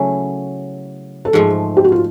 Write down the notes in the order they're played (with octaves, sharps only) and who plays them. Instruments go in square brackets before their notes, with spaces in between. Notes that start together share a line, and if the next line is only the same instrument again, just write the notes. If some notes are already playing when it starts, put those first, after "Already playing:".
Already playing: [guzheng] C#3 F#3 A3 C#4 E4
[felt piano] A4
[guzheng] G#2 F3 A3 [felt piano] G#4
[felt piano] G4
F#4
F4